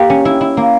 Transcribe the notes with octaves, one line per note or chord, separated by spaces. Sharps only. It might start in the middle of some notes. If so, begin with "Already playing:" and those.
Already playing: A#3 G4
C#4
E4
E4
A#3